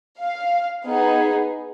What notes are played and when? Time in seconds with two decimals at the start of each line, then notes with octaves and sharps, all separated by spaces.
0.19 F5
0.86 B3 D#4 G#4